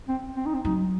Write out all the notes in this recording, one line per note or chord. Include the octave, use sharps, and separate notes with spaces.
C4
C4
D#4
C4
F#3 D#4